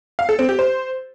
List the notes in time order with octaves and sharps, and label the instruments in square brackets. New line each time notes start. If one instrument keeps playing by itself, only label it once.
[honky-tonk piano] F5
A4
C4
G4
C5